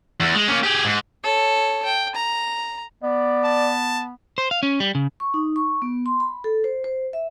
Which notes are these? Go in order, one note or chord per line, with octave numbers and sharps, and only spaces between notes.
E2
G#3
A#3 C#4
G4 G#4
G#2
A4 C#5
G5
A#5
B3 D5
A5
C5
F5
C#4
G3
C#3
C#6
D#4
C#6
B3
C6
B5
A4
C5
C5
E5